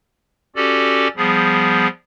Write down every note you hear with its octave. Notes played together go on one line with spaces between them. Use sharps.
C#4 F#4 G4 A4 D5
F3 G3 B3 G#4